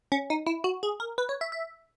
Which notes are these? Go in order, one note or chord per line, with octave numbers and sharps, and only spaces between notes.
C#4
D#4
E4
F#4
G#4
A#4
B4
C#5
E5
E5